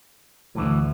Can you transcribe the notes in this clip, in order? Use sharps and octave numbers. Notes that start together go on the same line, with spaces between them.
D2 A2 E3